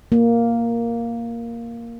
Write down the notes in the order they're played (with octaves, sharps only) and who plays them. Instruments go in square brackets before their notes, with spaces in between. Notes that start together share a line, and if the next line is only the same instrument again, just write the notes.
[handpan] A#3